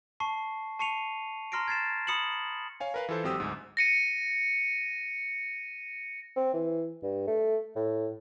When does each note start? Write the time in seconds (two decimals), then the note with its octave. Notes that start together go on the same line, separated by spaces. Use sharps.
0.20 A5 C#6 C7
0.79 A5 C#6 C7 C#7 D#7 F7
1.52 A#5 C6 F6 A#6 C7 D7
1.68 G#6 A6 C7 E7
2.07 B5 D#6 C#7 E7 F#7
2.80 C#5 F5 G#5
2.94 A#4 B4 F5
3.09 E3 F4 A4 C5
3.24 G#1 F#3 C4 G4 D#6 E6
3.40 D2 G#2
3.77 A#6 C#7 D#7
6.36 C4
6.54 E3
7.03 G2
7.27 A3
7.76 A2